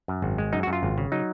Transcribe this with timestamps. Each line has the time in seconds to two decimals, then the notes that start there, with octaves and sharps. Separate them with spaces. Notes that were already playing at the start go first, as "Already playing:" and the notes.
0.08 F#2
0.22 G#1
0.38 G#3
0.53 F#2 D#4
0.63 F#4
0.67 F#2
0.73 F4
0.83 G#1
0.98 C#3
1.12 F#3 D#4